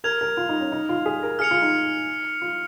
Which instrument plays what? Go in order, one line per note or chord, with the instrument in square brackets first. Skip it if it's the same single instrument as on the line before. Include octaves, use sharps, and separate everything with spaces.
[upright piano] A#4 [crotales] F6 G#6 F7
[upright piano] A#4
F4
D#4
C#4
D#4
F4
G#4
A#4
[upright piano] G#4 [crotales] F6 C#7 F7
[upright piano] F4
D#4
F4